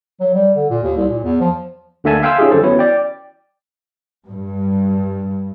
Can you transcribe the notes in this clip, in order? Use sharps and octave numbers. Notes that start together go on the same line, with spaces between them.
F#3
G3
D3
A#2
D#2
C2
A#2
E2
F3
D2 D3 A#3 E5 G#5 A5
E5 F5 G5 G#5 C6 E6
C#4 D#4 F4 G4 G#4
F#2 D3 A4 C5 A5
E3 B3 C#4 E4 F#4 C#5
D5 G5
G2